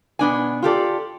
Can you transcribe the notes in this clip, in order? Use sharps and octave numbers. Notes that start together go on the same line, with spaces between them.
B2 B3 D4 G#5
F4 G4 A4 D5